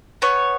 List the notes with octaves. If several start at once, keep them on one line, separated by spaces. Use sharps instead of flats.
B3 C#5